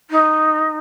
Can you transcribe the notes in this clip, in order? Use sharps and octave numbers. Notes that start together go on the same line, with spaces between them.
D#4